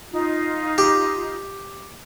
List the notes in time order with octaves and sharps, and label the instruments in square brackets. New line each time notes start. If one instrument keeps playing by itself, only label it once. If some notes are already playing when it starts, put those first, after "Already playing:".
[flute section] D#4 F4
[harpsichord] G4